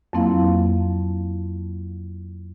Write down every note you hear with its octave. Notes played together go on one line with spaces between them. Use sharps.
F2 F#3 A#3 C4 E4 F5